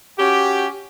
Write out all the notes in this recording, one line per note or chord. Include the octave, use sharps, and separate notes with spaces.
C#4 F#4 G4